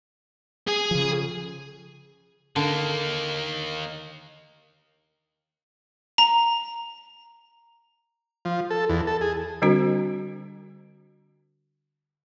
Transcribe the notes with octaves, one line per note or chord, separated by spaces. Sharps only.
G#4 G#5
C#3 F3
D3 D#3 A#3
A#5
F3
A4
E2
A4
G#4
D3 G3 C4 D4 F#4 C5